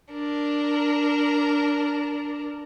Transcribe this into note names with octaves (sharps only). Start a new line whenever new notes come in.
D4 A#4